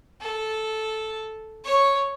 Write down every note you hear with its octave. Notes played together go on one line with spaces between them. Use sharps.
A4
C#5